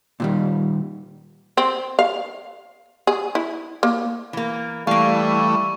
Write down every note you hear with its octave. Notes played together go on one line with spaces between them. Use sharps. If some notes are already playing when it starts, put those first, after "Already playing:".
A#2 D#3 G3
C4
F5
G#4
E4
A#3
E3 A#3
E3 G3 A3 A#3 F5 C#6